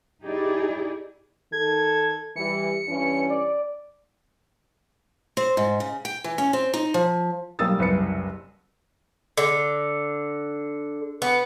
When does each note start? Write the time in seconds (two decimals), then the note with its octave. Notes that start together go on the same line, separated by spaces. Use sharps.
0.24 D#4 E4 G4 G#4 D5
1.52 D#3 A4 G#6
2.36 E3 G3 C#7
2.87 G2 E3 C#4
3.30 D5
5.37 C4
5.57 G#2
5.80 C#3
6.05 G5
6.24 E3
6.38 C#4
6.53 C4
6.74 D#4
6.94 F3
7.59 B1 G3 A#3 D#6 E6 A6
7.79 F#1 C2 B4 C#7
9.37 D3
11.22 B3